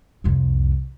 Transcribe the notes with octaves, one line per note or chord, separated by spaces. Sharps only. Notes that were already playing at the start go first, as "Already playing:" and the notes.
C2 F2